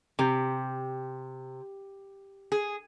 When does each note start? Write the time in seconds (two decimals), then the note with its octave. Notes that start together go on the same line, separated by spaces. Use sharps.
0.19 C3 G4
2.52 G#4